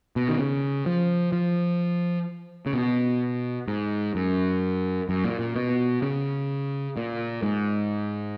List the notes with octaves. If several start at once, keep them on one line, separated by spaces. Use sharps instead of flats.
B2
D#3
C#3
F3
F3
C#3
B2
G#2
F#2
F#2
A#2
A#2
B2
C#3
A#2
G#2